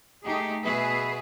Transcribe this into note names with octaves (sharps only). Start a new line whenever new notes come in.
A3 D#4 G4 G#4
B2 G#4 B4 E5